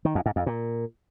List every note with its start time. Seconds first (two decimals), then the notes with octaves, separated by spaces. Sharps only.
0.05 D#3
0.15 F2
0.26 G#2
0.36 F2
0.46 A#2